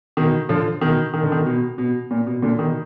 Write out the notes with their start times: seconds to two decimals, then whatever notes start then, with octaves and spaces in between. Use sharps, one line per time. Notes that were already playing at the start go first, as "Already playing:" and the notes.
0.17 B2 D#3
0.49 D3 F3
0.81 B2 D#3
1.14 D#3
1.23 D3
1.32 B2 D#3
1.46 B2
1.78 B2
2.11 A#2
2.27 B2
2.42 A#2 D3
2.59 B2 D#3